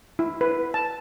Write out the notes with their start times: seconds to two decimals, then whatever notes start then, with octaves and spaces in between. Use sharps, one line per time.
0.19 E4
0.41 B4
0.74 A5